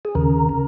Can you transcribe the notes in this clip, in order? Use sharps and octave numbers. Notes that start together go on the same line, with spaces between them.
G#4
D#2 C#3 A#4
C#3